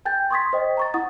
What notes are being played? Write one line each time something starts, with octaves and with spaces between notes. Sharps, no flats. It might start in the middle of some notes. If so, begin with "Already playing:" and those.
G5 G#5 G6 A6
C6 C#6 D#6 G#6 A6 B6
C5 D#5 G5
A#5 C#6 A6
E4 F#5 D#6 A6